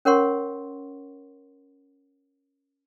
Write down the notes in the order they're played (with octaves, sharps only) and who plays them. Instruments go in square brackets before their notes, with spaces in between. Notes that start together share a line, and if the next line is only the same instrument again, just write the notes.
[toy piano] C#4 A#4 C#5 F#5 C6 C#6